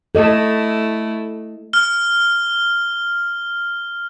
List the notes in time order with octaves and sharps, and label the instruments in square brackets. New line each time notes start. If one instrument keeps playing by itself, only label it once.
[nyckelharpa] A3 E4 [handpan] A4 D#5
[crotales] F6 G7